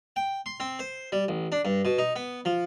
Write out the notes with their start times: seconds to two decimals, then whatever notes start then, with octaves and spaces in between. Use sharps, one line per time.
0.16 G5
0.46 C6
0.60 C4
0.79 C5
1.12 G3
1.28 A1
1.52 D4
1.65 G2
1.85 B2
1.98 D#4
2.16 B3
2.45 F3